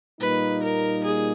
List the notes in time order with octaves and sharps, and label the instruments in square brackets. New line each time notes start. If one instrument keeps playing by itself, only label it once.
[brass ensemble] A#2 G3 A#3 D#4 [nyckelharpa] B4
[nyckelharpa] A#4
G#4